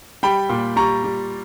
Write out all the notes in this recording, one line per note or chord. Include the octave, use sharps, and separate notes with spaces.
G3 G5 B5
A#2
G3 A#5 C#6
G3